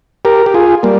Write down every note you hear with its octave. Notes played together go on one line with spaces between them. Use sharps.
G4 A#4
G4
F4 G#4
G3 A#3